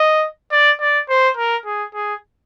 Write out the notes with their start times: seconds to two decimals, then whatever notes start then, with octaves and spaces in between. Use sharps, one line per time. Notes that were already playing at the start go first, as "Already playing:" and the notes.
Already playing: D#5
0.52 D5
0.81 D5
1.09 C5
1.37 A#4
1.66 G#4
1.94 G#4